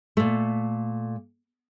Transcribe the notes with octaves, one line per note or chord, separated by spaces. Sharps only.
A#2 A3